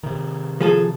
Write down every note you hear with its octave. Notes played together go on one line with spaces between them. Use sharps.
C3 D#3
F3 G#4 A4